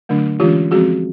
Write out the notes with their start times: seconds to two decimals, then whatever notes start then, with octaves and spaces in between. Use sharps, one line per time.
0.09 D3 F#3 A3 D4
0.40 E3 G#3 C#4 F4 G4
0.71 F3 G#3 C4 F#4 G#4